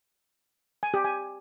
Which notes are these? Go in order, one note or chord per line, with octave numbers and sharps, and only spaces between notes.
G#5
G4
G#5